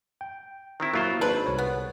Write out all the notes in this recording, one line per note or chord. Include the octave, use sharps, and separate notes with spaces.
G5
D#3 C4 E4
F#3 A#3 E4 F4 C5 B5
G#1 D4 B4 C5
C2 C#5
B3